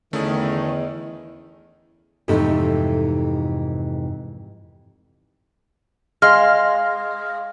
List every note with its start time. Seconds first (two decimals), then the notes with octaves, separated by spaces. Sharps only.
0.13 E2 D3 D#3 A3 C#4 E4 G#4
2.28 F2 G#2 C3 E3 A3 D#4
6.22 G#3 F5 C6 F6